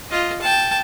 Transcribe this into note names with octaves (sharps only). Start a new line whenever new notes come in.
F4 D#5
G5 A5